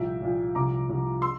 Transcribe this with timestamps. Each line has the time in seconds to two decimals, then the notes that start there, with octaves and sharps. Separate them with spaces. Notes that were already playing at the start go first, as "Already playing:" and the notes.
Already playing: C2 A#2 F3 E5 G5
0.22 C2 A#2 F3
0.55 C2 C3 F3 A#5 D6
0.90 C2 C3 F3
1.22 C6 E6